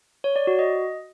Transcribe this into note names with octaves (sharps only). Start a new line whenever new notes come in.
C#5
D5
F#4
D#5